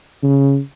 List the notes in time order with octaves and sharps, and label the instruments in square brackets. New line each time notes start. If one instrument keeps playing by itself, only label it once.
[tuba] C#3